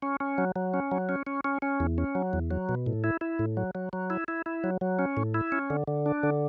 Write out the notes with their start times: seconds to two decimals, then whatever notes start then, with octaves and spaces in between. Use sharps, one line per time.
0.02 C#4
0.20 C#4
0.38 F#3
0.56 F#3
0.74 C#4
0.91 F#3
1.09 C#4
1.27 C#4
1.44 C#4
1.62 C#4
1.80 E2
1.98 C#4
2.15 F#3
2.33 E2
2.51 F#3
2.69 B2
2.86 A2
3.04 E4
3.21 E4
3.39 A2
3.57 F#3
3.75 F#3
3.93 F#3
4.10 E4
4.28 E4
4.46 E4
4.64 F#3
4.81 F#3
4.99 C#4
5.17 A2
5.34 E4
5.52 C#4
5.70 D3
5.88 D3
6.06 D4
6.23 D3